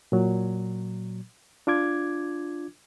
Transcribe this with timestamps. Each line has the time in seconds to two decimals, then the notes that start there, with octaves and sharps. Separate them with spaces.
0.12 A#2 F#3
1.67 D4 F4 D6 G#6